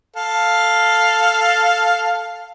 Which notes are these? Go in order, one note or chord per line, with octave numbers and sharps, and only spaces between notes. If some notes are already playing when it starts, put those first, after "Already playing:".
A4 F5